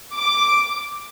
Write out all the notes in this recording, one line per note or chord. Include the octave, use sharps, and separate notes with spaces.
D6